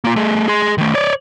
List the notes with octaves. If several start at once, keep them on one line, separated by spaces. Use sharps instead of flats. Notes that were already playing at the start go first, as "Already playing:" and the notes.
A#3 F4
A3 G#4
G#4 C6
D#3 A3
C#5 D5